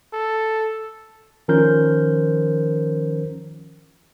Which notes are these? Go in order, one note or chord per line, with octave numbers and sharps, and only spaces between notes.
A4
D#3 F3 C#4 A#4 C5 G6